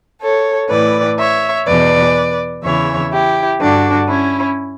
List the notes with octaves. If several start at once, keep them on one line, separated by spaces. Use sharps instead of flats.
A4 C#5
A2 E3 B4 D5
C#5 E5
E2 B2 B4 D5
E2 C#3 E3 C#5 E5
E4 G4
G2 D3 D4 F#4
C#4 E4